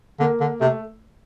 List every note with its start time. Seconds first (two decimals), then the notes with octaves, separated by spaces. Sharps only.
0.20 D3 A#3
0.40 D3
0.61 C3 A3